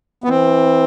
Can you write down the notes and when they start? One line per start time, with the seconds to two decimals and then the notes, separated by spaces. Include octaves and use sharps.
0.24 B3
0.29 E3 C4